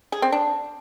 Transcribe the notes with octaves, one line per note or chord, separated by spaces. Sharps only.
G#4
C4
D4